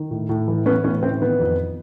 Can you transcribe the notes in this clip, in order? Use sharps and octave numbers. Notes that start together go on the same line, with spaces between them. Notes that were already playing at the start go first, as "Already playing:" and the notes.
Already playing: D#3
A2
A2
E3
E3 B3 C#4
A2 B3 C#4
E3 C4
D#3 B3
F2